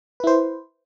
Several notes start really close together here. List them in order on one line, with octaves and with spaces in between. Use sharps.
B4 E4 C5